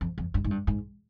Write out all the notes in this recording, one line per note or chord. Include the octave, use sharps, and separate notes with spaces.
F2
F2
G2
G#2
G2
G#2